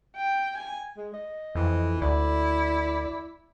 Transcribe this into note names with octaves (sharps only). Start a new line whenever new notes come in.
G5
G#5
G#3
D#5
F2 E3
D2 E4 D5